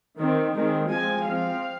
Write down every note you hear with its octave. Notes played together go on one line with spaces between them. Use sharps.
D#3 C4
D#3 G#3 C4
F3 G#3 C4 G#5
F3 C4 F5